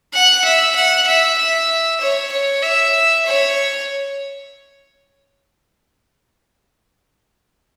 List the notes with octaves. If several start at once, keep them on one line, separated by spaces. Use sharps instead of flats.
F#5
E5
F#5
E5
E5
C#5
C#5
E5
C#5